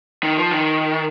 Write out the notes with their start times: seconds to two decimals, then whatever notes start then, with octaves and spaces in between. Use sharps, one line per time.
0.23 D#3
0.37 F3
0.51 D#3